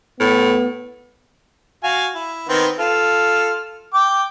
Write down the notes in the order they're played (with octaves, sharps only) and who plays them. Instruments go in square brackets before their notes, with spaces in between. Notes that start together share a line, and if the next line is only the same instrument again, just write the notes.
[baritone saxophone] A2 [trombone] B3
[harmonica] F#4 F5 G#5
E4
D#3 B3 C4
F4 A4 F6
G5 D6